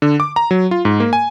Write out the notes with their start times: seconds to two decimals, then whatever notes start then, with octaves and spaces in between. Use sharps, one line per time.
0.02 D3
0.20 D6
0.36 A#5
0.51 F#3
0.71 F4
0.85 G#2
1.00 A#3
1.13 G#5